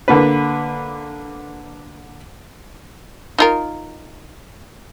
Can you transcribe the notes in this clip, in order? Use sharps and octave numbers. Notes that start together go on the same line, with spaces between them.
D3 A#3 B4
D#4 F4 A#4